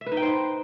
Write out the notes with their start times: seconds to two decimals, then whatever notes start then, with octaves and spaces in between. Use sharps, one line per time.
0.01 E5
0.06 B4
0.12 D#4
0.17 G5
0.22 C5